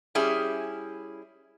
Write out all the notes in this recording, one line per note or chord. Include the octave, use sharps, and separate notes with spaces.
G3 C#4 E4 G#4